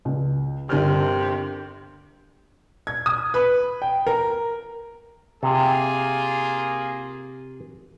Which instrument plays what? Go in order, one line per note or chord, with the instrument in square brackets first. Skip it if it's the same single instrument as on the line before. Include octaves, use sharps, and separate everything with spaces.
[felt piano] C#2
[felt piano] G1 A#4 F6 [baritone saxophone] C3
[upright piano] G#6
D#6
B4
G5
A#4
[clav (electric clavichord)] C3 [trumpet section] A#3 F4 G#4